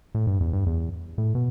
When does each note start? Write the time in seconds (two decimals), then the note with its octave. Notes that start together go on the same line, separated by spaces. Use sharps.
0.15 A2
0.27 G2
0.40 E2
0.53 G2
0.66 E2
1.18 A2
1.35 B2